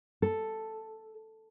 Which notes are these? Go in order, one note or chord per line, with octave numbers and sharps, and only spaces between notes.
A4